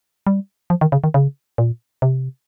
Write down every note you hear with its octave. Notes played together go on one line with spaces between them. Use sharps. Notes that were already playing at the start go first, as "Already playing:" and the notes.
G3
F3
D#3
C#3
D#3
C#3
A#2
C3